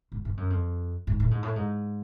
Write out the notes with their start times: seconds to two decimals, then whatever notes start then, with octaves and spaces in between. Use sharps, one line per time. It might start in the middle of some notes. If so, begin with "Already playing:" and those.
0.12 G#2
0.25 G2
0.37 F#2
0.50 F2
1.07 G#2
1.20 A2
1.31 G#2
1.43 A2
1.56 G#2